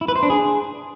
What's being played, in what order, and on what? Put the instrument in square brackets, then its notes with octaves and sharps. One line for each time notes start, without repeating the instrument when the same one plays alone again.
[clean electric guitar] E4
B4
C5
D4
G#4